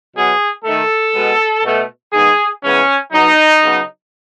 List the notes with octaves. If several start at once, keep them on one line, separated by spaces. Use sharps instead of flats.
B2 F#3 B3 G#4
D#3 A3 A4
B2 G#3 B3
B2 A3
D#3 G#3 B3 G#4
C#3 E3 G#3 B3 C#4
B2 F#3 B3 D#4
C#3 F#3 B3